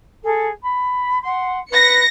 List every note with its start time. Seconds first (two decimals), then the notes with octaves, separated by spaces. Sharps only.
0.23 G#4 A4
0.62 B5
1.22 F#5 C6
1.71 B4 A#6 C#7